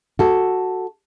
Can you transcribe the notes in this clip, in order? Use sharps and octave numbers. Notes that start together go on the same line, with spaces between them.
F#4 A4